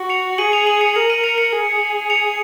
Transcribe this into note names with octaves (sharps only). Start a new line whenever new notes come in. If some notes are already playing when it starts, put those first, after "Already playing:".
Already playing: F#4
C#7 F7
G#4 D#7 F#7
C#7 F7
D#7 F#7
C#7 F7
A#4 C#7 F7
D#7 F#7
C#7 F7
C#7 F7
G#4
C#7 F7